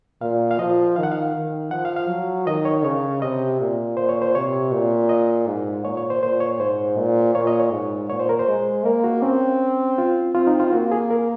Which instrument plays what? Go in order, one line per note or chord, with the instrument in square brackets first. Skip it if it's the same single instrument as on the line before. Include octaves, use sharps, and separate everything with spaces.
[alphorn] A#2 [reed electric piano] F5
[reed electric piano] F5
[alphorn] F3 [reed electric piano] D#5
[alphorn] D#3 [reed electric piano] F5
[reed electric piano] F#5
F5
[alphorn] D#3
[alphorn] F3 [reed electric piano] F#5
[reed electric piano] F5
F5
[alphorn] F#3
[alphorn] D#3 [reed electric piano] D#5
[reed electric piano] C#5
[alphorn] C#3 [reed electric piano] C#5
[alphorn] C3 [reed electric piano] D#5
[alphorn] A#2
[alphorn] A#2 [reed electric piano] C5
[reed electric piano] C#5
C5
[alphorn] C3 [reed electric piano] C#5
[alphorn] A#2
[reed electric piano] D#5
[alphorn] G#2
[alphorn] A#2 [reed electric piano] C#5
[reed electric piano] C#5
C5
[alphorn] A#2 [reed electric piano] C5
[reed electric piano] C#5
[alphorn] G#2 [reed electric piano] C5
[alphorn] A#2
[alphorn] A#2 [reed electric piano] C#5
[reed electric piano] D#5
C#5
[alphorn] G#2
[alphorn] A#2 [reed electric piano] C#5
[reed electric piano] C5
A#4
C5
[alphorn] G#3
[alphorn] A#3 [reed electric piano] A#4
[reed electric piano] F#4
[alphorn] C4 [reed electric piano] C#4
[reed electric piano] F4
[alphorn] C4 [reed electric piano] F4
[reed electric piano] D#4
F4
[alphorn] A#3 [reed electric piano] F#4
[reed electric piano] G#4
A#4